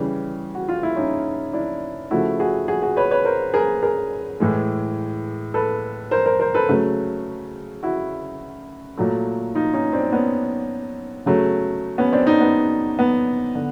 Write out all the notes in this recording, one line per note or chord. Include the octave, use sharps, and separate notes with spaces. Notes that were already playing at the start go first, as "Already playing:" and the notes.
Already playing: C#3 E3 G3
F#4
F4
E4
C#4 D#4
D4 E4
C#3 F3 A3 E4 F#4
F#4 G#4
F#4 G#4
F#4 G#4
B4 C#5
B4 C#5
A#4 C5
G#4 A#4
G#4 A#4
A2 E3 G#3
A4 B4
A#4 C5
A#4 C5
A#4 C5
A4 B4
C#3 F#3 A3
E4 F#4
A#2 F#3 A3
D#4 F4
C#4 D#4
C4 D4
B3 C#4
C#3 F#3 A3
B3 C#4
C4 D4
C#4 D#4
B3
B3
D3